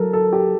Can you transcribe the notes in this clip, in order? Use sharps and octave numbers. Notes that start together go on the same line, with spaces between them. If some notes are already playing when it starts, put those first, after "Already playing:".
Already playing: F#3 A4 A#4
A4
G4